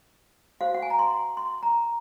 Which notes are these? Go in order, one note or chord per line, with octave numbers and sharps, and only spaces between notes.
F#4 C5 F5
F#5
G#5
A#5
C6
C6
A#5